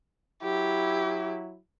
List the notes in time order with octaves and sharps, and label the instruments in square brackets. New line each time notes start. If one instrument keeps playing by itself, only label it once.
[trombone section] F#3 E4 [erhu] G4